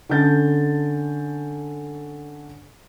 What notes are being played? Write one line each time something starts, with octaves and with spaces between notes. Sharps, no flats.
D3 C#4 A4 G6 A6